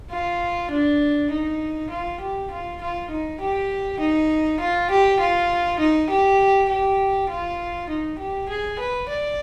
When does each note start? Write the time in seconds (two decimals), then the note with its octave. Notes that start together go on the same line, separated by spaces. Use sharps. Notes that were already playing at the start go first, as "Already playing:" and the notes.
0.10 F4
0.71 D4
1.31 D#4
1.90 F4
2.20 G4
2.50 F4
2.81 F4
3.10 D#4
3.40 G4
4.00 D#4
4.60 F4
4.90 G4
5.19 F4
5.79 D#4
6.10 G4
6.69 G4
7.29 F4
7.89 D#4
8.18 G4
8.49 G#4
8.79 B4
9.09 D5